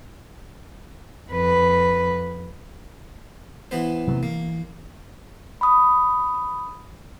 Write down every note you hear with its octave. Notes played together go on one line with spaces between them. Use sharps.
F2 B4
E3 B3 C5
C3 F#3 A3
E3 A#3
B5 D#6